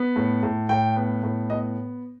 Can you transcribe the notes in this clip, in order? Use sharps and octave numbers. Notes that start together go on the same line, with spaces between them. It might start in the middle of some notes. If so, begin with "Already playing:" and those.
Already playing: B3
A2
A2
A2 G5
B3
A2
B3 D#5